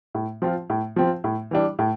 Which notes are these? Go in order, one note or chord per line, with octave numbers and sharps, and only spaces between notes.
A2
F3 C4 F4
A2
F3 C4 F4
A2
E3 G3 D4
A2